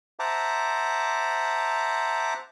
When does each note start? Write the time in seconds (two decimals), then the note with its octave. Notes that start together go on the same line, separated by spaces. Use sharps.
0.19 C5 E5 F#5 A5 A#5 D6